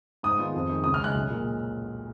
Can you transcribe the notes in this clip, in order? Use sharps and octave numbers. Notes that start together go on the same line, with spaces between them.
G#2 D#6
D#3 G#3 B3 F4
F2
D#3 G#3
C#2 D#6
F6
C#3 G#3 F#6
B1
A#2 G#3